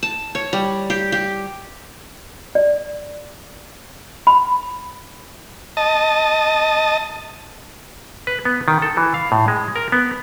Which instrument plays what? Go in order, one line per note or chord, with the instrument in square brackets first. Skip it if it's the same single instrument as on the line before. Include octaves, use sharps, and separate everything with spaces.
[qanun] A5
C#5
G3
G4
G4
[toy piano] D5
B5
[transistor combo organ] D#5 A5
[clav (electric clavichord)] B4
B3
D#3
A4
E3
F5
A2
G#3
A#4
B3